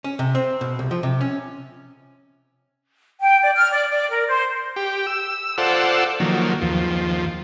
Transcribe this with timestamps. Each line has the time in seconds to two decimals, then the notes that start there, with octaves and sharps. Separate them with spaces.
0.04 C#4
0.19 C3
0.35 C4
0.61 B2
0.79 C2
0.91 F3
1.03 C3
1.21 C#4
3.20 G5
3.42 D5
3.56 F6
3.73 D5
3.90 D5
4.11 A#4
4.29 C5
4.76 G4
5.07 E6
5.58 F4 A4 C5 D5 F#5 E6
6.20 D#3 F3 F#3 A#3
6.62 D#2 F3